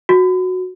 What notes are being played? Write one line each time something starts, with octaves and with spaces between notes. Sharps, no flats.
F#4